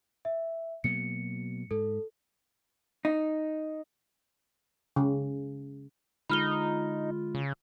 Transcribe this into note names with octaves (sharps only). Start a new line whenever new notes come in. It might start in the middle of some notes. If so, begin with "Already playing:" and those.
E5
B2 F#3 A#3 C#7
G#2 A4
D#4
C#3
D3 G#3 D#4 F4 B5 F6 G7
C#3